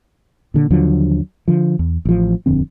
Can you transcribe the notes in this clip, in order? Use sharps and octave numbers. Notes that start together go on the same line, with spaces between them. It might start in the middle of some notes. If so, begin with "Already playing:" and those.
A#2 D3
D#2 D3 F3 F#3
D3 F3
E2
A1 F3
D#1 F2 D3 C4